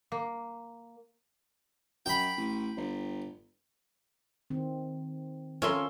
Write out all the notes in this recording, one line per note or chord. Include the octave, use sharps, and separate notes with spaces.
A#3
F#2 G5 B5
A1
G1
D#3 C4
C#4 F4 A4 A#4 C#5 E5 C6